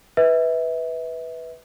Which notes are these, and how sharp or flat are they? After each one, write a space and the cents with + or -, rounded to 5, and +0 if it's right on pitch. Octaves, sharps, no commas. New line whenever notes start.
B4 +0 E5 -30